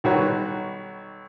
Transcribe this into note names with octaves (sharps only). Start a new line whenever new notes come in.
B1 D#3 G3 F#4 B4 C#5